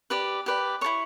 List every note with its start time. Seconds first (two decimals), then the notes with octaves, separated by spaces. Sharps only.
0.10 G4 B4 D5
0.46 G4 B4 D5
0.81 E4 A4 C#5 C#6